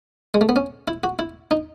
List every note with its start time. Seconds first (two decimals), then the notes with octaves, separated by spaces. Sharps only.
0.34 G#3
0.41 A3
0.49 B3
0.56 C#4
0.88 E4
1.04 F#4
1.19 E4
1.51 D#4